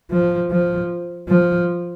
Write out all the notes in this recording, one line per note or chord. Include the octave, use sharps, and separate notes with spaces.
F3
F3
F3